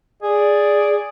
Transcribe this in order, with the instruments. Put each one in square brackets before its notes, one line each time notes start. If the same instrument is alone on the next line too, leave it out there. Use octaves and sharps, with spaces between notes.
[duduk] G#4 [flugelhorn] D5